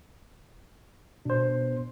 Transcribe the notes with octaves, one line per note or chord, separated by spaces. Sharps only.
B2 D4 C5